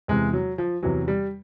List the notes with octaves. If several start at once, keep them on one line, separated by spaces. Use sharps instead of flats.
E2 C3 E3 G#3
F#3
F3
E2 C3 E3 F#3
G3